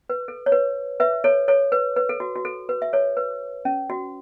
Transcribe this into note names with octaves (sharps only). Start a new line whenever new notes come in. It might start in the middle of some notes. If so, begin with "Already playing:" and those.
B4
A4
C#5
B4
B4 E5
A4 C#5
A4 C#5
B4
B4
A4
F#4
F#4
A4
B4
E5
A4 C#5
B4
C#4
F#4